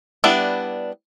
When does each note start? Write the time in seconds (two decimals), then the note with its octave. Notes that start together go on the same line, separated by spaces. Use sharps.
0.24 G3 B3 D4 E4